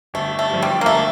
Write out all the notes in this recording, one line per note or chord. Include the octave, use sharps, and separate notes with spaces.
G1 A3
A3
G2 F3
G3
A#3
G1 A3